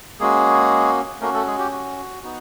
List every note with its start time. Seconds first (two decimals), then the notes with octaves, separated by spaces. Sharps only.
0.20 G#3 A#3 C#4 F#4 G#4
1.21 A3 A#3 C#4 F#4 A#4
1.34 A3 A4
1.47 G#3 G#4
1.59 G4
1.71 F#4
2.23 B3 D#4 F#4